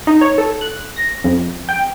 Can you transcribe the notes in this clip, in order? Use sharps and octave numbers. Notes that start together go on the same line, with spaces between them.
D#4
C#5
A4
F#6
A#6
F2
G5